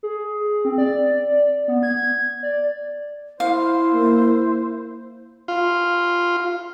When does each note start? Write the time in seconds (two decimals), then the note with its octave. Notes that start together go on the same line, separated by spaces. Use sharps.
0.03 G#4
0.65 C4
0.78 D5
1.68 B3
1.83 G#6
2.43 D5
3.40 E4 C5 F5
3.94 A#3
5.48 F4